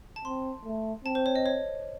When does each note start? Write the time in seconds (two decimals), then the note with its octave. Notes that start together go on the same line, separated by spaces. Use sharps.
0.16 A5
0.25 C4 C6
0.65 A3
1.05 C4 A5
1.15 C5
1.26 C#5
1.36 D#5
1.46 C#5